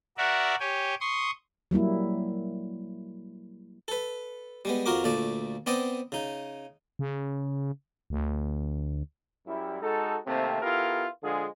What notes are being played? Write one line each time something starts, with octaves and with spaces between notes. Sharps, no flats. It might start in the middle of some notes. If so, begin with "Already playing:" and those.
F#4 A#4 D5 E5 F#5
G4 C#5 G5 G#5
C6 C#6 D#6
F#3 G3 A#3 E4
A4 B4
G3 G#3 B3
F2 F4 F#4 A#4 D6
D2 A#2 A3 D5
B3 C4 D5 D#5
C#3 D#4
C#3
D2
F#2 G3 E4
G#3 D#4 F#4 A4
C3 D#3 A3 A#3 C4
B3 E4 F4 G4 A4 A#4
D3 F3 G#3 F4 G#4